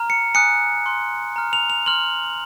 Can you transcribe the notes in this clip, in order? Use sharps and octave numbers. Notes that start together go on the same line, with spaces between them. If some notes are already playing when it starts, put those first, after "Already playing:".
Already playing: A#5 F6
C#7
G#5 D#6 F#6 C#7
C6 F#6
A#5 F6
F7
F7
C6 F6 F#7